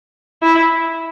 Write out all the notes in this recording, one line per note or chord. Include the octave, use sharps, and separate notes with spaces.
E4